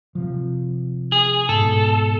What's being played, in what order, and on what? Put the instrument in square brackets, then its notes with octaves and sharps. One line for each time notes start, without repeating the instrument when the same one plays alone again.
[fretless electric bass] C3 F3
[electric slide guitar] G#4
[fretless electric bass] G#2 B2 [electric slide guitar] A4